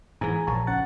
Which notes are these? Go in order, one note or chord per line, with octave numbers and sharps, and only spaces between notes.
G#2 E3 G#4 G#5 A#5
A#1 C#5 A5 A#5
C#2 C#4 F#5 A6